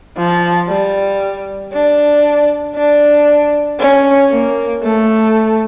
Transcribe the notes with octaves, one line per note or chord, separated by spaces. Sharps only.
F3
G3
D4
D4
C#4
A#3
A3